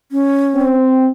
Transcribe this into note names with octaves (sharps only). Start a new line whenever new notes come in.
C#4
C4